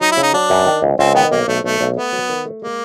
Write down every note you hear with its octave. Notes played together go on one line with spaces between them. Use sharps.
F#3 D#4
E4
C#3
D#4
F#3 D4
F#2
D#3
C#2
C#2 C4
D#3 B3
B1 A#3
B1 A3
B1 A3
B1
A3 B3
F#3
D#3
A3
G#3 A#3